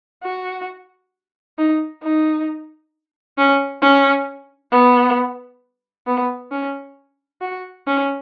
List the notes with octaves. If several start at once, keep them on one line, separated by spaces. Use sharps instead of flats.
F#4
D#4
D#4
C#4
C#4
B3
B3
C#4
F#4
C#4